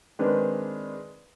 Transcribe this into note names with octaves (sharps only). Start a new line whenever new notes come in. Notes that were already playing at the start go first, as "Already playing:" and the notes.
D#3 G#3 C4 D4 B4